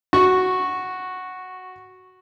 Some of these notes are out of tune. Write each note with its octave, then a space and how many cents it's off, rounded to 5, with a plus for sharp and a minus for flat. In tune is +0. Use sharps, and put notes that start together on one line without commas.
F#4 +0 C#6 -10